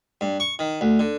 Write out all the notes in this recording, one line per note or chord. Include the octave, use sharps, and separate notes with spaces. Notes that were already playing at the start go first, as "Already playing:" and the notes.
G2
C#6
D#3
D2
D3